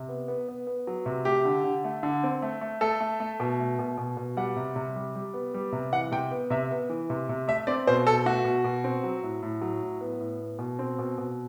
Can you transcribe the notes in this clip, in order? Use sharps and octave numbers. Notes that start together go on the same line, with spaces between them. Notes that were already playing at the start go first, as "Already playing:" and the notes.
Already playing: C3
B3
B3
B3
B3
F#3
C3
A3 G4
D3
D3
A3
D3
C4
A3
A3
A3 A4
A3
A3
B2
A3
B2
B2
B2
G3 F#5
C3
C3
G3
G3
B3
G3
C3
E3 F#5
C3 G5
B3
C3 E5
B3
E3
C3
C3
A3 E5
C4 D5
B2 C5
B2 A4
A3 F#4
B2
B2
C4
F#3
A2
A2
F#3
A2
B3
A2
B3
B2
C4
B2
B2